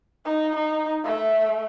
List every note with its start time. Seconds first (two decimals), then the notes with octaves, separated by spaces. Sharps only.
0.25 D#4
0.55 D#4
1.04 A3 E5